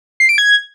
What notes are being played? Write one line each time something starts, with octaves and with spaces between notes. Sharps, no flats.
C7
D7
G#6